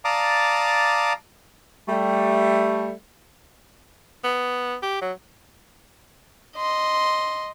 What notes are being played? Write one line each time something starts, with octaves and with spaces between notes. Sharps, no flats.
D5 F5 A5 A#5 D6 D#6
G3 A3
B3
G4
F#3
D#5 C6